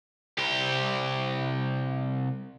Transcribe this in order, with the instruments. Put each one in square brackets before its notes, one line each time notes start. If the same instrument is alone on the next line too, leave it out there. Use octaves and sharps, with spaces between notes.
[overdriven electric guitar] C2 G4